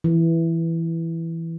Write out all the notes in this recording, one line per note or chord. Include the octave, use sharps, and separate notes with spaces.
E3